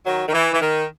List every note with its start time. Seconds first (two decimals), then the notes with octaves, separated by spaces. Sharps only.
0.05 D#3 F#3
0.27 D#3
0.33 E3
0.53 E3
0.60 D#3